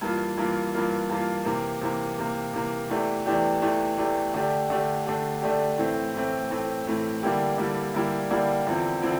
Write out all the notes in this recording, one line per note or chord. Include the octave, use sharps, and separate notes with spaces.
G2 E3 A#3 F4
G2 E3 A#3 F4
G2 E3 A#3 F4
G2 E3 A#3 F4
C3 E3 A#3
C3 E3 A#3
C3 E3 A#3
C3 E3 A#3
E2 E3 A3 D4 G4
E2 E3 A3 D4 G4
E2 E3 A3 D4 G4
E2 E3 A3 D4 G4
D3 A3 D4 G4
D3 A3 D4 G4
D3 A3 D4 G4
D3 A3 D4 G4
A2 E3 A3 C4
A2 E3 A3 C4
A2 E3 A3 C4
A2 E3 A3 C4
D3 G3 A#3 E4 G4
D3 G3 A#3 E4 G4
D3 G3 A#3 E4 G4
D3 G3 A#3 E4 G4
E2 D3 F3 C4 E4
D3 F3 C4 E4